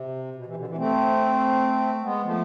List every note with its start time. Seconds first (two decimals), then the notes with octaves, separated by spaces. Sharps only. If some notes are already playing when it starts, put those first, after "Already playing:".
Already playing: C3
0.36 B2
0.46 C3 E3
0.56 B2 D3
0.67 C3 E3
0.78 A3 C4
2.03 G#3 B3
2.24 F3 A3